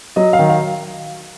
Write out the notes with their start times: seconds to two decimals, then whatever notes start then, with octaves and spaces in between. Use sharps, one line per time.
0.16 F#3 D#5
0.33 F5
0.39 D#3
0.50 F5